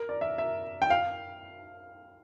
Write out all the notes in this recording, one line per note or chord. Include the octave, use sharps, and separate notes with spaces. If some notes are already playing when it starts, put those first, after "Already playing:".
Already playing: A#4
D5
E5
E5
G5
F5